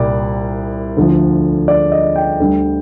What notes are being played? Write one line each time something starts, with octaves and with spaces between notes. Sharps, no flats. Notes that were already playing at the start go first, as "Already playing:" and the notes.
Already playing: C2 A#2 G3 D5
D2 D3 F3
D5
D#5
G5
D2 D3 G3